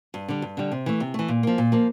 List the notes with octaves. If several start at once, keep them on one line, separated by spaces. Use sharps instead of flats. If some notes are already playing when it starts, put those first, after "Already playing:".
G2
D3 G3
G2
D3 G3
C3
E3 A3
C3
E3 A3
A#2
F3 A#3
A#2
F3 A#3